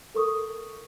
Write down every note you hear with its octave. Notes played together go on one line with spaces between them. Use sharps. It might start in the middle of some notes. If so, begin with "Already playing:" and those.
A4 A#4 C#6 D#6